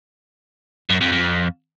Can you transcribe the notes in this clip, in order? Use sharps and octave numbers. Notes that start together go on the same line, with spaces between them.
F#2
F2
F2